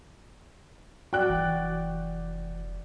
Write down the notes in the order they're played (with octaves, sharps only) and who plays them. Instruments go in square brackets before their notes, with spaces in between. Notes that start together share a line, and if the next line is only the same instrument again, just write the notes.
[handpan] F#4 D5 [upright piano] G5 F#6
[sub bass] F1 [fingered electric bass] E3